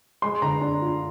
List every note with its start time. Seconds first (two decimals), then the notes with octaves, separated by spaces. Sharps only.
0.22 G#3 C6
0.42 D3 A#5
0.61 D4
0.82 F4